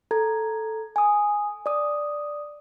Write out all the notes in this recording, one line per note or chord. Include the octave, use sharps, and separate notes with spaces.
A4 A#5 G#6
G#5 D#6
D5 D#6